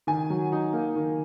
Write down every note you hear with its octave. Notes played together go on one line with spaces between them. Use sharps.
D#3 G#5
F#3
D#4
A#3
D#3